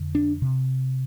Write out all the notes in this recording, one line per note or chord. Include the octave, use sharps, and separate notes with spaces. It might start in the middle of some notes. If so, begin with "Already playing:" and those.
Already playing: F2 D3
D4
C3